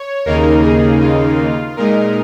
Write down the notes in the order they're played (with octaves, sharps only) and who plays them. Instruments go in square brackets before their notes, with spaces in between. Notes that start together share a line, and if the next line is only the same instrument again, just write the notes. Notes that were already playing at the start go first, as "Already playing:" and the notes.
Already playing: [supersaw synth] C#5
D#2 C#3 A#3 D#4 A#4
G#4
F4
A#2 G#3 D#4 A#4